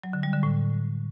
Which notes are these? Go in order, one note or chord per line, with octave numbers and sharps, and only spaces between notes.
F#3
D3
G3
D3
A2